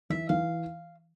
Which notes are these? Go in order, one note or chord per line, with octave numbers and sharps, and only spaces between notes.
E3 E5
E3 F5